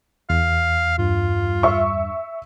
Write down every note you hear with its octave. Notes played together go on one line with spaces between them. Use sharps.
E2 F5
G2 F4
E5 C#6